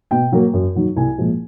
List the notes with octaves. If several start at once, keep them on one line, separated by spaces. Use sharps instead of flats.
B2 G5
F#3 A#3
F#2
D#3 F#3
C2 G#5
A#2 F3 G#3